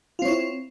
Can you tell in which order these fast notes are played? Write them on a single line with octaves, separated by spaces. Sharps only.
F4 C4 C#5 E4